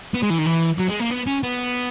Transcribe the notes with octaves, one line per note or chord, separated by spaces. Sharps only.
B3
G#3
E3
D#3
E3
F#3
G#3
A#3
B3
C#4
B3